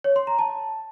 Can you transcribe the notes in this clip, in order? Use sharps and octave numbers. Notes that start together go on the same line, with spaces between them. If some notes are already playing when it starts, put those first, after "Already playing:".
C#5
C6
A#5
A5